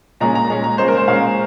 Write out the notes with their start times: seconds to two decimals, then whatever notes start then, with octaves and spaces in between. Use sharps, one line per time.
0.20 A#2 G#3 C#4 A#5
0.35 A#5
0.49 A#2 G#3 C#4 A#5
0.64 A#5
0.78 A#2 G#3 C#4 C5
0.88 A#4
0.98 C5
1.08 A#2 G#3 C#4 F5